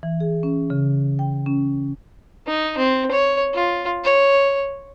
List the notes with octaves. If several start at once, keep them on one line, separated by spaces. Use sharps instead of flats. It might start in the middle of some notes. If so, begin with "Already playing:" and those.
E3
G#4
C#4
C#3
G5
C#4
D#4
C4
C#5
F4
C#5